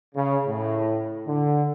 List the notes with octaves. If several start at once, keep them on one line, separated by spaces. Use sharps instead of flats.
C#3
A2
D3